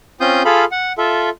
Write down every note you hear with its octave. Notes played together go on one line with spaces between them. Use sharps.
C4 C#4 F4 C6 D#6 G6
F4 G#4 A4 F5 B5
F#5
F4 A4 E5